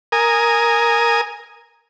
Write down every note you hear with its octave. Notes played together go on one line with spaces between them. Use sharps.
A#4 G#5 D#6